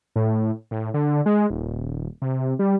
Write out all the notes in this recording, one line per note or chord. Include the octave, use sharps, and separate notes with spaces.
A2
A2
D3
G#3
D#1
C3
G3